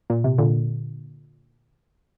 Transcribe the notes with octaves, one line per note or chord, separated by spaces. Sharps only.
A#2
C3
A#2 D3